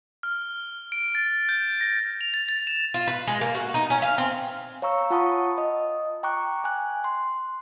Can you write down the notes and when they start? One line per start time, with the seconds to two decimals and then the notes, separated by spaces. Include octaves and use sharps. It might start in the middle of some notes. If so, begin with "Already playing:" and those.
0.23 F6
0.92 D7
1.15 A6
1.49 G6
1.81 A#6
2.21 F7
2.34 A6
2.49 A6
2.67 E7
2.94 F4
3.07 B4
3.27 G#3
3.41 A#3
3.55 F#4
3.74 D#4
3.90 C#4
4.02 F5
4.18 C4
4.82 C#5 F5 A#5 C#6 E6
5.10 F4 F#5 A5 B5 C#6 D#6
5.58 D#5 D#6
6.23 G5 A#5 C#6 D6 F#6
6.64 G#5 F#6
7.04 C6